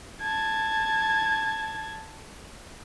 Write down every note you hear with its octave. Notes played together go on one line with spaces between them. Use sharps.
A5 G#6